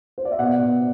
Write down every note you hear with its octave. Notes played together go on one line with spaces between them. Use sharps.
C5
D5
E5
B2 D5 F#5
B2